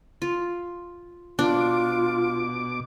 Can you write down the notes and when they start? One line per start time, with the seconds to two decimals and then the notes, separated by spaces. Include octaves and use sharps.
0.22 F4
1.39 B2 D4 F4 D6